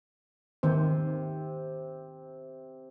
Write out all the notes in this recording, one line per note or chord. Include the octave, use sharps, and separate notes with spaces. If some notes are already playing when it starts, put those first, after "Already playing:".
C3 D#3 C4 C5